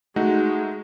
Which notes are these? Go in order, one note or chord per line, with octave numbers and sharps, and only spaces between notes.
G#3 A3 D#4 F#4